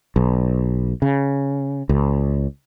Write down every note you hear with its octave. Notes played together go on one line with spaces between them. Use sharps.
B1
C#3
C#2